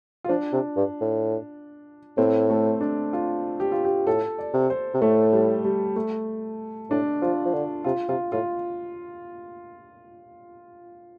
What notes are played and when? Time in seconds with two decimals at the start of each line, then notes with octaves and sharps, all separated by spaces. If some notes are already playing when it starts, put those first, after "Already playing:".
0.24 F4
0.29 F3 D4
0.52 C3
0.76 G2
1.01 A2
2.18 A2 C4
2.50 A3
2.81 D4
3.13 F4
3.60 G4
3.72 F4
3.85 G4
4.06 A2 A4
4.39 D5
4.54 C3
4.70 C5
4.94 C3
5.01 A2 A3
5.33 G3
5.64 G3
5.96 A3
6.90 A2 D4
7.22 F3 F4
7.45 F3
7.54 D3
7.84 C3 F4
8.09 C3 F4
8.32 A2 F4